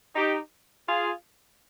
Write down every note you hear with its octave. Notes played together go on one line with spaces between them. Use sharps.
D#4 G4
F4 G#4